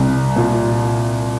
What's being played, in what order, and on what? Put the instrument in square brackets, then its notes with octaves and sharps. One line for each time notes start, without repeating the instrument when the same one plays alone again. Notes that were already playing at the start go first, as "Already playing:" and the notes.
Already playing: [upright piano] C2
A#2